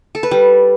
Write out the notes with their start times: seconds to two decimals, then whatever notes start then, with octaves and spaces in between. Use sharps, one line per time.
0.15 A4
0.23 B4
0.31 G3